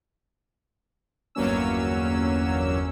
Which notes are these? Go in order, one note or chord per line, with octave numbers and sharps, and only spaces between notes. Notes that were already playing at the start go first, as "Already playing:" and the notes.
G1 E2 F#3 A#3 C#4 E6